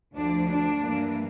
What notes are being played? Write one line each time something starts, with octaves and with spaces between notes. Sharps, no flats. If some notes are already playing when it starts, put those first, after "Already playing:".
D2 D3 F3 D4
D4
G2 E3 A#3